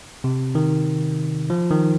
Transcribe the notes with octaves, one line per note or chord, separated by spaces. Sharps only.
C3
D#3
F3
D#3